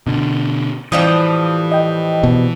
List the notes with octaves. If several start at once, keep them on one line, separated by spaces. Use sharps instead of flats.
B2 D3
A2 E3 F3 G3 D#6
D#5 G5
B2